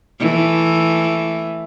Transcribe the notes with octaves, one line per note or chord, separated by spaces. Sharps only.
E3 A3